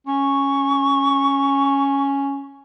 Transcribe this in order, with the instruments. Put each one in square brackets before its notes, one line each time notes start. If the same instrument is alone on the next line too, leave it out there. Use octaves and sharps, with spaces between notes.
[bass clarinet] C#4 [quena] C#6